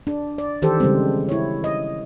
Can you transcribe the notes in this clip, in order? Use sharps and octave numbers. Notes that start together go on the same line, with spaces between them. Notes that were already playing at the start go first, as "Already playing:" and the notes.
D4
D5
D#3 E3 G4 A4 C5
C#3 G3 G#3 C4
E4 C#5
D#5